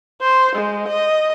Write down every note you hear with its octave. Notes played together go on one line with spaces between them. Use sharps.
C5
G#3
D#5